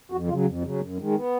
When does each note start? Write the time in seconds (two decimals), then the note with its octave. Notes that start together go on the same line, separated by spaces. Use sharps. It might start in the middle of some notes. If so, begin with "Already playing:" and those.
0.12 F2 F#4
0.28 C#3 F#3 F4
0.46 F2
0.63 C#3 F#3
0.80 F#2
0.98 D#3 G#3
1.15 B3